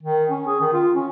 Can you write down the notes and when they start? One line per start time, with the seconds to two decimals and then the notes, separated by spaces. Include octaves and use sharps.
0.03 D#3
0.29 C#4
0.47 G#4
0.60 D#3
0.73 F4
0.94 C#4